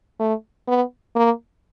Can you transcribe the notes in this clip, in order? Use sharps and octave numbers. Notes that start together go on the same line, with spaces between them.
A3
B3
A#3